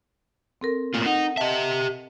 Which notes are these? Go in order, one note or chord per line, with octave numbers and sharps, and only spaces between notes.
C4 A4 A#4
A2 A#3 F4
D#4 F#5
G4 D#5 E5 A5